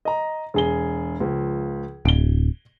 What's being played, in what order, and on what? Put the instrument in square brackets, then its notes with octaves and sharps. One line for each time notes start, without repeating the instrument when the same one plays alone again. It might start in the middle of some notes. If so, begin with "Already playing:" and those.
[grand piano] D#5 A#5
E1 G#4 G7
C#2 F3
[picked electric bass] D1 [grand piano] D7 G7